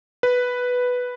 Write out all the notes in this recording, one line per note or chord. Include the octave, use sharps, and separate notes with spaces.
B4